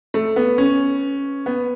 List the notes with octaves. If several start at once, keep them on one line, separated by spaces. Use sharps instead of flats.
A3
B3
C#4
B3